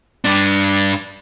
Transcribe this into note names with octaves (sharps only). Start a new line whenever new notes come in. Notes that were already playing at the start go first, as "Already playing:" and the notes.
G2 D4